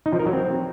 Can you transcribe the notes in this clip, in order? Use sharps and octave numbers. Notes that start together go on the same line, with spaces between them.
D#4
F3
A#4
F#3
C4